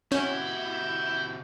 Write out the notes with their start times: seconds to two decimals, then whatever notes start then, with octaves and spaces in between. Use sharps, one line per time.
0.12 C3 C#4 E4 F#4 G6